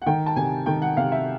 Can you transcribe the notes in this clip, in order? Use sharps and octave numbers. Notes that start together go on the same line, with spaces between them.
F#5
D#3 G5
A5
C3 G#5
D#3 G5
F#5
C3 F5
E5